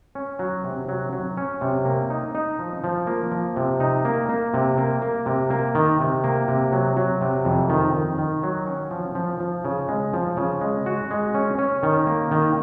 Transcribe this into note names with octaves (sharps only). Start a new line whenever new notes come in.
C#4
F#3
C3
F#3
F#3
C#4
C3
A#3
D#4
D#4
F3
F3
A#3
F3
C3
D#4
A#3
A#3
C3
A#3
A#3
C3
A#3
D#3
C3
A#3
C3
F#3
F#3
C3
F2
D#3
D#3
D#3
F#3
C#4
F3
F3
F3
C#3
G#3
F3
C#3
G#3
F#4
G#3
C#4
C#4
D#3
A#3
D#3